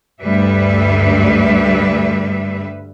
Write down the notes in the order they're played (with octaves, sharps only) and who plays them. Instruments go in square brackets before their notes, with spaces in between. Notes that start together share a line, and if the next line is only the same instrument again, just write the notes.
[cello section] D2 G2 G3 B4 E5